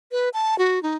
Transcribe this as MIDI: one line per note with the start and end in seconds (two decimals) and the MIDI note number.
0.12 0.29 71
0.34 0.57 81
0.58 0.82 66
0.83 0.96 63